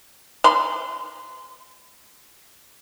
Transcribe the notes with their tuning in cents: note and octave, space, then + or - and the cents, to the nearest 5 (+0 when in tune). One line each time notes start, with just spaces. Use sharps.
C6 -25